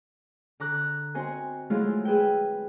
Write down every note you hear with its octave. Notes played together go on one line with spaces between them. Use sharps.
D3 A#5 D6 F#6
C4 F#4 C5 D#5 G#5
F3 F#3 G#3 A3 E4 F4
G#4 B4 E5 G5